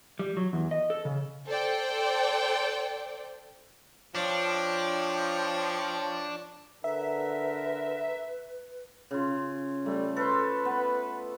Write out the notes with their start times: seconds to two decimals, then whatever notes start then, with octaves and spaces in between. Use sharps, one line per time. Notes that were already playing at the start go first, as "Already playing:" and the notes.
0.19 G3
0.37 F#3
0.53 E2
0.71 D#5
0.90 A4
1.05 C#3
1.47 A4 C5 D5 G5
4.15 F3 D4 C#5 G5
6.84 D3 A#4 B4 E5
9.11 C#3 F4
9.86 G3 A3
10.16 A4 B4 C5
10.65 B3